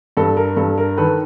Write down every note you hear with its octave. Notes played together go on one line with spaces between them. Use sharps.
G2 A4
A#4
G2 A4
A#4
D#3 A4 B4